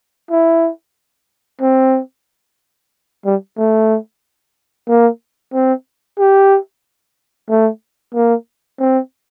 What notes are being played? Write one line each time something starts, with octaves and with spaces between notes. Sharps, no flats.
E4
C4
G3
A3
A#3
C4
G4
A3
A#3
C4